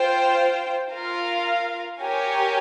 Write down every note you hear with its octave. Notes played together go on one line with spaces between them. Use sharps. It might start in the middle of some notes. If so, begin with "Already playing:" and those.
Already playing: F4 C5 G5
F4 A#4 F5
G4 A#4 C#5 G#5